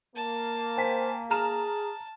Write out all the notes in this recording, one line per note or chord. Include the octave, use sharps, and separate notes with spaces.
A#3 A5
C5 G5 G#5 B6
G#4 A5 A#5 F6 E7